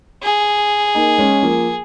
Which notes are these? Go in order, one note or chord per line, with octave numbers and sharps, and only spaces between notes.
G#4
A#3 D#4
G#3 C#4
F3 A#3